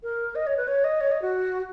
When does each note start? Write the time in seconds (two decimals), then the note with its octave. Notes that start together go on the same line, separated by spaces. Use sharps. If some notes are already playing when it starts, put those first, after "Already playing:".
0.03 A#4
0.35 D#5
0.47 C#5
0.57 B4
0.68 C#5
0.84 D#5
1.01 C#5
1.11 D#5
1.22 F#4